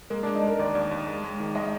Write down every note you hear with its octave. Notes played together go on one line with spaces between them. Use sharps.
G#3 A#3
G#3 D4
D#4
G#3 A#4
D#2 D5
D#2
D#2
G#3
G#3
D#3
G#3 D#5